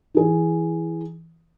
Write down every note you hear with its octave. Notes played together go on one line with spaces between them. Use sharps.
E3 G#4